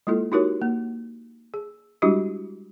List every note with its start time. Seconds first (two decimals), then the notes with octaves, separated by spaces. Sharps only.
0.07 G#3 A#3 E4 F4 A4
0.32 D#4 E4 F#4 G4 A#4 C#5
0.62 A#3
1.54 G#4
2.02 G3 G#3 D4 E4 F#4 G4